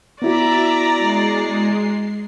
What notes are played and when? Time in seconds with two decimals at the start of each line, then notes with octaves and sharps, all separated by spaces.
0.22 B3 E4 F#4 D5 E5 A#5 D6 B6
0.97 G#3 C7